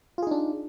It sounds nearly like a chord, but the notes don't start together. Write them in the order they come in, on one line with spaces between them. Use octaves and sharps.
F4 G#4 D#4 D4